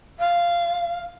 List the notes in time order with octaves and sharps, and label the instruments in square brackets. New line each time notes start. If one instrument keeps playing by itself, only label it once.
[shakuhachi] F5